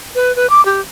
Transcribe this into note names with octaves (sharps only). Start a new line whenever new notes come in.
B4
B4
D6
G4